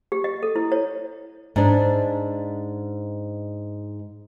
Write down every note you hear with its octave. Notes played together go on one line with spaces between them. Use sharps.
G4
D#5
A4
E4
C#5
G#2 D4